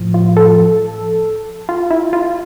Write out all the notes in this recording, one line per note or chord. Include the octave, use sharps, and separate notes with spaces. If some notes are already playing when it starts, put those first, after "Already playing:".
Already playing: A2 F3
F4
A4
F4
E4
F4